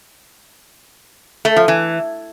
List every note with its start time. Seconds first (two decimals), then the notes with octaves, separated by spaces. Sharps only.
1.45 A3
1.56 F3
1.68 E3